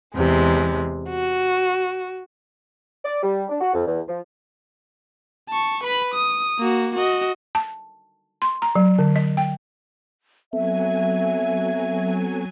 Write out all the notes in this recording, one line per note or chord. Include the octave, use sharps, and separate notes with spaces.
E2 C3 G#3
F#4
D5
G3
D4
F#4
F2
E2
F3
A5 C#6
B4 B5
D#6
A#3 F#4
F#4 D#5
A5
C6
A#5
F#3
D3
D#5
G5
F#3 B3 C4 A4 E5 G#5